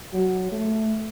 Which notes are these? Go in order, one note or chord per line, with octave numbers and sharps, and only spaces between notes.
F#3
A3